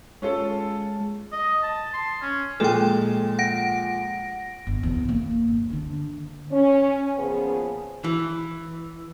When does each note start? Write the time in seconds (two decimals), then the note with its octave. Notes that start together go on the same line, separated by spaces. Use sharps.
0.22 G#3 C#4 F4 A4
1.32 D#5
1.63 A5
1.94 C6
2.22 C#4
2.60 A#2 F3 G#3 A4 G5
3.39 F#5 A#6 D7
4.67 G1
4.83 B1 E2
5.09 A#3
5.48 G1
5.70 D3 D4
6.51 C#4
7.18 A#2 C#3 F3 B3 G#4
8.04 E3